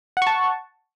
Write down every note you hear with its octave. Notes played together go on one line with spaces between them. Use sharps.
F#5 A5 C#6